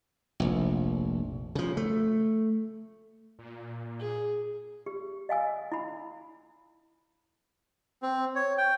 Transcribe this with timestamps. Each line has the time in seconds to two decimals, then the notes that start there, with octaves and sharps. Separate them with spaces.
0.40 F1 A#1
1.55 C#3 F3
1.77 A3
3.39 A#2
3.99 G#4
4.86 G4
5.29 D#5 F5 G#5 E6
5.72 E4 B5
8.02 C4
8.35 C#5
8.58 G5